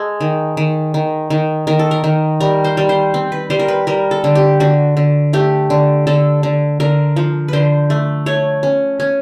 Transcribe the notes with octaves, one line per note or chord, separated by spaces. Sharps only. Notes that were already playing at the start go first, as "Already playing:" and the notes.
Already playing: G#3 A4
D#3
D#3
D#3
D#3
D#3 A#4
A4
A#4
D#3
G3 A#4
C5
G3
C5
C4
B4
G3 C5
A#4
B4
G3 A#4
A4
D3
G4
D3 F#4
D3
A3 G4
D3
D3 A4
D3
D3 A#4
F3
D3 B4 C5
A3
A3 C#5
C#4
C#4